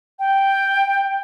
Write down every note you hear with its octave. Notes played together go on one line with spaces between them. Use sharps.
G5